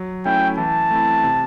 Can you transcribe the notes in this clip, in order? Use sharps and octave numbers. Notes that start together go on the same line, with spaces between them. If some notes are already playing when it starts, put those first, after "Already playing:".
Already playing: F#3
A3 C#4 E4 G5
E3 A5
A3 C4 E4
C3